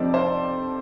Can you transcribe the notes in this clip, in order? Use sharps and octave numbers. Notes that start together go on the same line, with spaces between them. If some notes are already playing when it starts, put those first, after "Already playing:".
Already playing: F2 C3 F3 C4 D#4 D5
C5